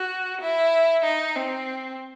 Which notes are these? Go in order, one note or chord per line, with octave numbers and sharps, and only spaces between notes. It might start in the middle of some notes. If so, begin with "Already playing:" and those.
Already playing: F#4
E4
D#4
C4